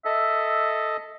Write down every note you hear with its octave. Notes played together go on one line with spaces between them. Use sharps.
A4 D#5 E5